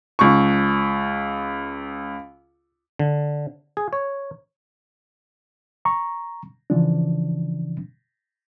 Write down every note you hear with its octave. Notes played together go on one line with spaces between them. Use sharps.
C#2 C#6
D3
G#4
C#5
A#5 C#6
C#3 E3 F3 D4